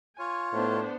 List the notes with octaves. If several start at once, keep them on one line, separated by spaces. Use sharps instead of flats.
F4 C#5 G#5
A2 B3 D4 C5